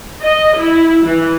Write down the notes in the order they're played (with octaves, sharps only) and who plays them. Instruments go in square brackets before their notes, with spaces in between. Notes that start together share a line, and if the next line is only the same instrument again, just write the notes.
[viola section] D#5
E4
E3